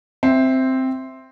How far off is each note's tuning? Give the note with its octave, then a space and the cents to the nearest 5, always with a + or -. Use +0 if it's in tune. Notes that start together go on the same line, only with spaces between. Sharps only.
C4 +0 E5 +0